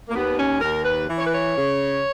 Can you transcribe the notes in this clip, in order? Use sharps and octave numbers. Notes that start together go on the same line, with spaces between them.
A#3
D#2 B3
C#4
D#2 A#4
B4
E3
C#5
B4
C#5
C#3